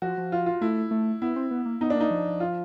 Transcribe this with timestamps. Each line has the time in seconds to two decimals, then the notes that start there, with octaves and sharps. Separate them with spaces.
0.02 F3 F#4
0.18 F3
0.32 F4
0.46 F4
0.61 A3 E4
0.91 A3
1.22 B3 E4
1.36 C4
1.51 B3
1.65 A#3
1.81 B3 D#4
1.90 D4
1.95 A#3
2.00 D#4
2.11 F3
2.40 F4